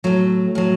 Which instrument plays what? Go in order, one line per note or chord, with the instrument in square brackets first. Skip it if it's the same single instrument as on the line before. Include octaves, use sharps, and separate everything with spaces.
[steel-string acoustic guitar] A2 F#3 A3
A2 F#3